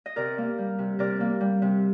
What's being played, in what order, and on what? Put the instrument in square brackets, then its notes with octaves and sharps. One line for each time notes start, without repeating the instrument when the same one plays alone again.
[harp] D#5
C3 A#4 D5
A#3
G3
C3
C3 A#4 D5
A#3
G3
C3